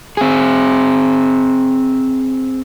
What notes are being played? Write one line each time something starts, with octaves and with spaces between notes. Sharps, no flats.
C4 G#4